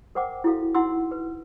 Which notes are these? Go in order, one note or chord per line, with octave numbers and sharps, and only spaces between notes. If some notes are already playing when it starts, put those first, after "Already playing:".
A#4 C5 F#5 G5 D6
E4 F#4 A4 F5
D#4 E4 F#5 C6 E6
B4